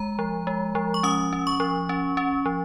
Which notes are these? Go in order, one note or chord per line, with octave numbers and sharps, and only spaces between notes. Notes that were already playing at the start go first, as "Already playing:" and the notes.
Already playing: G#3 A#5
F3
G#3
F3
C#6
C#4 D#6
C#4
C#6
F3
C#4
C#4
F3